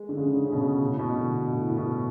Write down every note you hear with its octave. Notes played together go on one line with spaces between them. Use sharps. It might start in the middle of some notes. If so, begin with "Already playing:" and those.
Already playing: G#3
D3
C#3
D3
C#3
B2
C#3
A2
B2
D3
A2
A2
B2